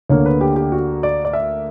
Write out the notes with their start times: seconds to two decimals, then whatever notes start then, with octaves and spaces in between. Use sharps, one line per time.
0.10 D2 D3 A#3 C#5
0.26 B4
0.41 G4
0.56 G4
0.72 F#4
1.03 D5
1.25 D5
1.33 E5